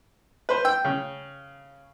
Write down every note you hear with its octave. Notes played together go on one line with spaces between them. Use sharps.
B4 C5
G5 E6
C#3